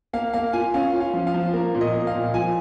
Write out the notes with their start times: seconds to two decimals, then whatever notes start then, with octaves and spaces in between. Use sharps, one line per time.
0.13 A#3 F5
0.34 A#3 F5
0.53 F4 G#5
0.74 C#4 F5
0.93 F4
1.01 F5
1.14 F3
1.27 F5
1.34 F3
1.53 A#3 A#4
1.74 A#2
1.81 D#5
1.94 A#3
2.07 F5
2.14 A#2
2.34 F3 G#5